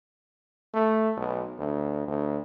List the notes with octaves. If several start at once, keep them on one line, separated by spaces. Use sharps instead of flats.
A3
B1
D2
D2